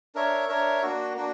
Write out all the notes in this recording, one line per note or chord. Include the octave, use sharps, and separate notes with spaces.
D4 A#4 C#5 E5
D4 A#4 C#5 E5
A#3 D4 F#4
A#3 D4 F#4